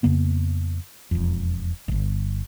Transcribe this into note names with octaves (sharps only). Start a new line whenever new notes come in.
F2 C#3 A#3 B3
E1 F2
D1 G1